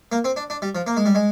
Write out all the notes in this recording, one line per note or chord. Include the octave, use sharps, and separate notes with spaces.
A#3
C4
D4
D4
G3
F3
A#3
G#3
G3
G#3